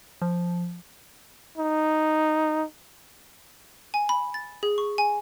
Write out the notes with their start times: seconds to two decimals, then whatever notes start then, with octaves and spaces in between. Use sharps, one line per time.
0.22 F3
1.58 D#4
3.94 G#5
4.09 B5
4.34 A6
4.63 G#4
4.78 C#6
4.98 G#5